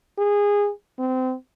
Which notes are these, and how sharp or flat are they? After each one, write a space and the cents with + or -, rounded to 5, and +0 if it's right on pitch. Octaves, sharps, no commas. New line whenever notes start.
G#4 -20
C4 -25